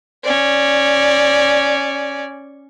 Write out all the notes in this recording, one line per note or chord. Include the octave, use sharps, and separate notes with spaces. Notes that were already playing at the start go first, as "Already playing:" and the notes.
C#4 D5